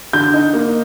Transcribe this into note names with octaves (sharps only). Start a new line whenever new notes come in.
D3 G6
D#4
A#3